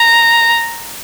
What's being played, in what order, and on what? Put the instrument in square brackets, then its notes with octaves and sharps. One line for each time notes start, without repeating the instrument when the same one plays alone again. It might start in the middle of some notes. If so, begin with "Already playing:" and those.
Already playing: [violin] A#5